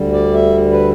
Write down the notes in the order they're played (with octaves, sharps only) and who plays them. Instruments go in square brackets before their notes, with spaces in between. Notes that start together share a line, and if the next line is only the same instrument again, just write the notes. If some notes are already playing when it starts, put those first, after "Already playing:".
Already playing: [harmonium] D2 D3 G3
D5
E5
B4